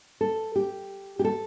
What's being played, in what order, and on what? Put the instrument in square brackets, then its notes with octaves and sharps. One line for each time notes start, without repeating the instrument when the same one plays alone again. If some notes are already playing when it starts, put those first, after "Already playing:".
[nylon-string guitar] A4
G4
G4
A4